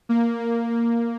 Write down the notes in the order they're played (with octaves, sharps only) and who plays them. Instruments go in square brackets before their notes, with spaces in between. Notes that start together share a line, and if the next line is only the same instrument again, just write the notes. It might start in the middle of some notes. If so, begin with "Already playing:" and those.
[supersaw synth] A#3
A#3
A#3